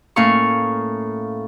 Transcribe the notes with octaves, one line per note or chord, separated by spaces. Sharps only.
A2 A#3 C#4 F5 C#6